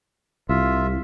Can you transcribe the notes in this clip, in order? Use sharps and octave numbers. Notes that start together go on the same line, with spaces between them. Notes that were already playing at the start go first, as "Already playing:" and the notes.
C2 F4 E5